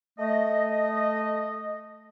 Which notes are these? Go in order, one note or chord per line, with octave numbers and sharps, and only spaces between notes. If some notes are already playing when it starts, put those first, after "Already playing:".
A3 D#5